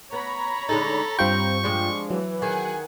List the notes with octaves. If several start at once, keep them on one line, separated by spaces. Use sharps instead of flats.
B3 C#5 A#5 B5
D3 G#3 D#4 A4
G2 G3 C4 F4 C5 G5 C#6
F3 G#3 D4
E3 F#3
D#3 G#4 F#5 G#5